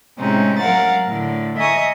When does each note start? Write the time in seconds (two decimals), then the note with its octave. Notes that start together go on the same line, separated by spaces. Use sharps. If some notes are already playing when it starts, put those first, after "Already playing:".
0.18 A2 C3 G#3 C4 C#4 D#4
0.58 F#3 A#4 F5 F#5 A6
1.06 A2 D3
1.57 D#5 E5 G#5 A#5 C#6 D#6